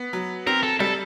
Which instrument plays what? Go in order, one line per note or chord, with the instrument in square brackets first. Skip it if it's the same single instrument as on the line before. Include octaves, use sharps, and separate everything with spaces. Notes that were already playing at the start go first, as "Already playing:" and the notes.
Already playing: [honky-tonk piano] B3
F#3
[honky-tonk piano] C4 [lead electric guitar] A#4
[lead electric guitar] A4
[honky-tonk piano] G3 [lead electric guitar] A4